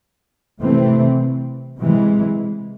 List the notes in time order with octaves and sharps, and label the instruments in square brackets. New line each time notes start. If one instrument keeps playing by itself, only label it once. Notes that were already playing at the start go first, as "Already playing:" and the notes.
[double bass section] C3 E3 A3 C4
C3 E3 G#3